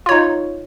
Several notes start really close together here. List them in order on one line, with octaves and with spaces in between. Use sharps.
F4 C#5 D#4